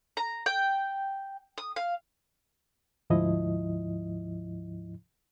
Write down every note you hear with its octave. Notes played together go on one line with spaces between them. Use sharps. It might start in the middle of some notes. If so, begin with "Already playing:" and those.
A#5
G5
D#6
F5
D2 G#2 F3 E4 D#5